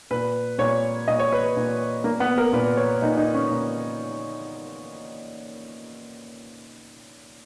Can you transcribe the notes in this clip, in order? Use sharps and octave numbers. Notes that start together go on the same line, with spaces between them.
A#2 B4
A#2 C#5
A#2 D#5
C#5
B4
A#2
A#2 A#3
B3
A#4
A#2 B4
C#5
A#2 D#4
D#4
C#4
A#2